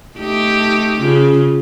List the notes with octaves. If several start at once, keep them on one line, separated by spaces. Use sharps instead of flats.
A3 D#4 G4
C#3 F4